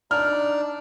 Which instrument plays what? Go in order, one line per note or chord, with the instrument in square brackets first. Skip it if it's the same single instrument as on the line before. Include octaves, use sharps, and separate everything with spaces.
[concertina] D4 D#4 D5 [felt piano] F6